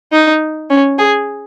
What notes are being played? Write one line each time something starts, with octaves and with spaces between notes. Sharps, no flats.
D#4
C#4
G#4